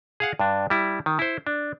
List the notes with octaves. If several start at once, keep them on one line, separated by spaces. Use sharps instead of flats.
G#4 F5 F#5
G2 D4
G3 E4
D#3
E4 C5
D4